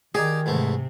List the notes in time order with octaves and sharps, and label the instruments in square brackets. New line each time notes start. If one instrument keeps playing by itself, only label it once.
[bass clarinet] D#3 [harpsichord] D#4 G4 D5 [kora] G#4
[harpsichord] E2 G#2 A3 [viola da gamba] C3